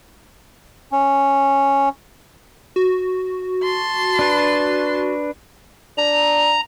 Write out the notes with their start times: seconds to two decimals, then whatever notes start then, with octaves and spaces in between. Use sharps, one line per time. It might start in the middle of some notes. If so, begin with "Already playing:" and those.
0.92 C#4
2.76 F#4
3.64 A5 C6
4.19 D4 B4
5.97 D4 A#5